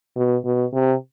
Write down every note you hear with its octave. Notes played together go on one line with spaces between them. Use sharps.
B2
B2
C3